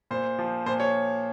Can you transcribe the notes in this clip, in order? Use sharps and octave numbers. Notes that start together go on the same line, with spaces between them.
A#2 C5
F3
A#2 C5
C#5